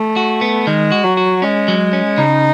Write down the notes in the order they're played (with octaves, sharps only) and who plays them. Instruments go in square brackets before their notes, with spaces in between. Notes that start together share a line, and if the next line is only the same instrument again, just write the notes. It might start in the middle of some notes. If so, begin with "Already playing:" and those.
Already playing: [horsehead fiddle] A3
[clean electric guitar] F#4
B3
[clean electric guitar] D#3 [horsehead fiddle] G#3
[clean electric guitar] F#4
[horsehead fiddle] F#3
[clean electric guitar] F#4
[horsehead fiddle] G#3 [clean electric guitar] C#4
[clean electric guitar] F#3
C#4
[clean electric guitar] C#3 [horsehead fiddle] D#4